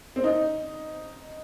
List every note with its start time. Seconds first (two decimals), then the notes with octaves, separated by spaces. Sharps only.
0.16 C4
0.24 D#4